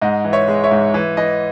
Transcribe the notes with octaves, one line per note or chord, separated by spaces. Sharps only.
G#2 D#5 F#5
E3
C#5 E5
G#3
C#5 E5
G#2
E3
E3 D#5